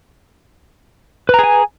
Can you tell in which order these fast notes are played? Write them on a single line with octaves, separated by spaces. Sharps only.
B4 A#5 G#4 G#5